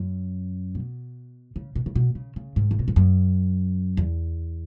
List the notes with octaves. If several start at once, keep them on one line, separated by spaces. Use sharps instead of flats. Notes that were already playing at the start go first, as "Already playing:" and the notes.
Already playing: F#2
B2
C#3
B2
C#3
B2
C#3
C#3
G#2
C#3
B2
G#2
F#2
E2